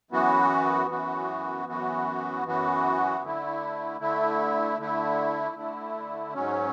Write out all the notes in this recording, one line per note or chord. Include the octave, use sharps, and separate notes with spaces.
F#2 E3 B3 F#4
F#2 E3 B3 F#4
F#2 E3 B3 F#4
F#2 E3 B3 F#4
D3 A3 E4
D3 A3 E4
D3 A3 E4
D3 A3 E4
G#2 F#3 C#4